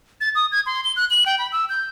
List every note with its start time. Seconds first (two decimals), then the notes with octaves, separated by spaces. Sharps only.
0.21 A6
0.35 D#6
0.52 G#6
0.66 C6
0.84 G7
0.97 F#6
1.11 F#7
1.26 G5
1.38 B5
1.52 E6
1.69 G6